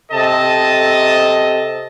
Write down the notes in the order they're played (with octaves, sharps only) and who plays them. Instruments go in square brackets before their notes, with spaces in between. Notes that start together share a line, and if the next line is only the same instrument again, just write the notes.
[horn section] C3 A4 D#5 A5